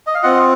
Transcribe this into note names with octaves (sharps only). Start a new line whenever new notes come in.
D#5
F5
C4 F4 D#5 F#5